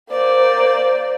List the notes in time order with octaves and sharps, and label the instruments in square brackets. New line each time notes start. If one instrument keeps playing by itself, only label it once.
[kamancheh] A#3 D5 [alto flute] C5